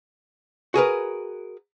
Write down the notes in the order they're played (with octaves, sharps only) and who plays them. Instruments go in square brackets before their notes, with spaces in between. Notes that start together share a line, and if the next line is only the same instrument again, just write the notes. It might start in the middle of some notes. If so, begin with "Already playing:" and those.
[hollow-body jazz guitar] F#4 G#4 A#4 B4